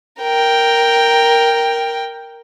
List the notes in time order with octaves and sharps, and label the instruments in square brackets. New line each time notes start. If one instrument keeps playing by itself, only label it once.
[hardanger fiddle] A#4 G5